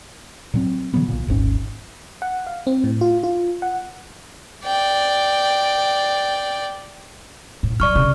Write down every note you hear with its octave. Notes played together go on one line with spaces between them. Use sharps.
A#2 F#3 C4
D3 E3 F#3 B3
B1 A#2
D#1 G#1 G#2 C#4
F#5
F5
C4
A2
F4
F4
F#5
D5 G5
A2
F#3 D5 C#6 F6
C#3